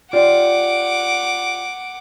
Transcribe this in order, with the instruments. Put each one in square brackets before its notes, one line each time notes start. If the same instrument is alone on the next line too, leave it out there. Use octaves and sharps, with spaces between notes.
[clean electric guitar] F4 G4 D5 [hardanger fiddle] F#5 D6